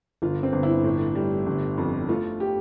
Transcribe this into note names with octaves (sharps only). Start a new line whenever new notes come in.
G1 F4
C4
G1
E4
A2
G3
G1
F2
A3 F4
G4